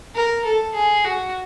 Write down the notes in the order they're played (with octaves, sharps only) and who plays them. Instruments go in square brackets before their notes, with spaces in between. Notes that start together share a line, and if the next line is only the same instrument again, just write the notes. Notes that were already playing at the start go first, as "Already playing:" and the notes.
[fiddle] A#4
A4
G#4
F#4